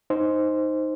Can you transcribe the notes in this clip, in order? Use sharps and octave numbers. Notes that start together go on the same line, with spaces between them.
D#4 C5